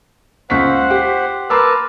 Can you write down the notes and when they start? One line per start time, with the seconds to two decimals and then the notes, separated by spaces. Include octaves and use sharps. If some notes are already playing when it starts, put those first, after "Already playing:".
0.50 C#2 C5 F#5 C#6 B6
0.90 G4
1.50 A#4 B4 A5 C6 D6 E6